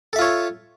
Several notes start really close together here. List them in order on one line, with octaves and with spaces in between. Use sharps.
A4 E5 F4 C#5